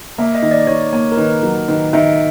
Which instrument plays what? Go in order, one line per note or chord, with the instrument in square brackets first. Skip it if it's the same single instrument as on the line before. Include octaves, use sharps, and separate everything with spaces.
[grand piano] A#3 [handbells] E5
[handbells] D#5
[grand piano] D#3
[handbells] D5
[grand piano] D#3 [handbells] C#5
[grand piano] A#3 [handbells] C#5
[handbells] A#4
[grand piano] D#3 [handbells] B4
[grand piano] F#3 [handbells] A#4
[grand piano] D#3 [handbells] B4
[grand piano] D#3 [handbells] E5